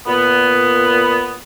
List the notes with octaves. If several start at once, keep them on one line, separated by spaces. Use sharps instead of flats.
A#2 B3